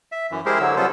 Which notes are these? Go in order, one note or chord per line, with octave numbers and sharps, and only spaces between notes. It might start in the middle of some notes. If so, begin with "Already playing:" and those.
E5
F#2 E3
G#3 E4 G4 G#4 A#4 C5
D3 F#3 E6
C#3 G3 B3 F4 A4 C5